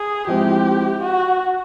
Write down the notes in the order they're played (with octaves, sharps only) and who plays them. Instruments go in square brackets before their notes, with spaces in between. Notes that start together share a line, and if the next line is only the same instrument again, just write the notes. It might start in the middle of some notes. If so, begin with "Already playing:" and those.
Already playing: [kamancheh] G#4
[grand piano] F3 G#3 C4 E4 [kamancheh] G4
[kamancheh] F#4